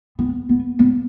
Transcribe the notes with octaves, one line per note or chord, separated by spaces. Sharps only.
B3
B3
B3